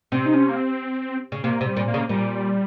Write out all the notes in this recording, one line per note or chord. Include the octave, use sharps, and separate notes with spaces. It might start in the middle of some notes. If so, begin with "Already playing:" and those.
C3 C4
D#4
C#4
A#3
C4
C#3
C3 A#3
C3
G3
A#2
A#3
C#3
A#2 G3